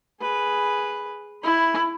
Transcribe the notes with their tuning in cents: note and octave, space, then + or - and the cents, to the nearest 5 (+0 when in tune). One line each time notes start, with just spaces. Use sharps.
G#4 +0 B4 +0
E4 +0 B5 +15